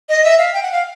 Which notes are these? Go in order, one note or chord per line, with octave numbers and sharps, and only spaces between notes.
D#5
E5
F5
G5
F#5
F5